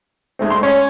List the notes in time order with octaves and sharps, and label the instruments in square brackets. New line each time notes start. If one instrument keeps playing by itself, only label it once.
[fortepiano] G#3 A3 C4
C6
[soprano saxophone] C#4 [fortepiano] C#5